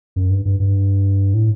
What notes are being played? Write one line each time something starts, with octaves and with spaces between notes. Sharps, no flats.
F#2
G2
G2
G2
A2